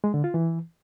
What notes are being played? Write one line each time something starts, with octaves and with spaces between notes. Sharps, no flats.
G#3
D3
F4
E3